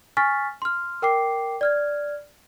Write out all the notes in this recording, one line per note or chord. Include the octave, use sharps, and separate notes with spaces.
G#5 C#6 F6 A6 B6
C6 F6
A#4 G5 D6 C7
D5 F6 G#6